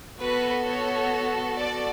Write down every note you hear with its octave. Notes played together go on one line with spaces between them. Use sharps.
B3 F#4 A4 B4
C#5
D5